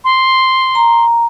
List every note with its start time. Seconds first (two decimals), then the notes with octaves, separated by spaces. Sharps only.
0.04 C6
0.75 A#5